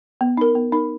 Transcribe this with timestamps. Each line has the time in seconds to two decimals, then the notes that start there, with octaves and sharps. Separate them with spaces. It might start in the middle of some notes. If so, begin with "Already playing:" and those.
0.21 B3
0.37 D#4 A#4
0.55 B3
0.72 D#4 A#4